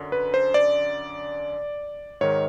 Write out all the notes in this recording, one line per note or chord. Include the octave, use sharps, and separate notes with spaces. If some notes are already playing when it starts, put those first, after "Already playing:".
Already playing: F#2 D3
B4
C5
D5
G#2 D#3 C#5